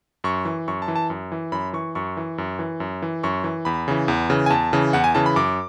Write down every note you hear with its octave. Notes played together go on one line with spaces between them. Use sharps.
F#2 C#6
E3
F#2 C#6
A5
E3
A5
F#2
E3
F#2 B5
E3 C#6
F#2 C#6
E3
F#2
E3
F#2
E3
F#2 C#6
E3
E2 B5
C#3 E3
E2
C#3 E3
G#5
E2 A5
C#3 E3
E2 F#5
G#5
C#3 E3 A5
B5
F#2 D6